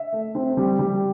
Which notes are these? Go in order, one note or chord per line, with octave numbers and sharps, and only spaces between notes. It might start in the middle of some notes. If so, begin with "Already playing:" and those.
Already playing: E5
A3
C4
G3
G3